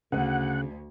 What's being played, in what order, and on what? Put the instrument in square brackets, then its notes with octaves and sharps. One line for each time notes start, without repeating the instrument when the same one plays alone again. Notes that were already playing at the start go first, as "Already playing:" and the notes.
[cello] D2 [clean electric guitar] C#3 [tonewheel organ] F#5